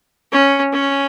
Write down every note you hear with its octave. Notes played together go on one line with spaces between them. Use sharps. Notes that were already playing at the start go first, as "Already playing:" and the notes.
C#4
C#4